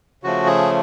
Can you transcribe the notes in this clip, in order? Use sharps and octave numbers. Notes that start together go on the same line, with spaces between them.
C#3 F3 A3 F#4
G#4